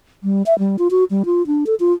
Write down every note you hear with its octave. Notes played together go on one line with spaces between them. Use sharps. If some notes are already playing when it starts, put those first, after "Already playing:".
G3
E5
G3
F4
F#4
G3
F4
D4
A4
F4